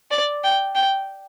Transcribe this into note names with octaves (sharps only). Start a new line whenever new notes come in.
D5
G5
G5